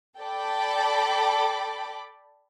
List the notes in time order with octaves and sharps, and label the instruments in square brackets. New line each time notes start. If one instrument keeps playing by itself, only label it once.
[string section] A4 D5 G5 A5 B5 D6